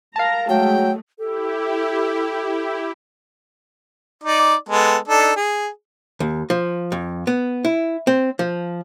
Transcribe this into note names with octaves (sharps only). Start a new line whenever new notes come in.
A#4 F5 A5 A#5
F#3 G#3 A3 G5
E4 G4 A4
D#4 D5
G#3 B3 A4
D4 D#4 A4
G#4
D#2
F3
F2
B3
E4
C4
F3